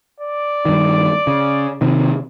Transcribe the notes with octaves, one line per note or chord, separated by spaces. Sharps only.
D5
G2 D#3
C#3
C3 D#3